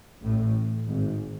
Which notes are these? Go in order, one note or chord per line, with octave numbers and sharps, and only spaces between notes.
A1 A2
G#1 G#2